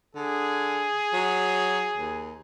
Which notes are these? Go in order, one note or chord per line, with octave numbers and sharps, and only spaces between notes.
D3 G#4
F#3
D#2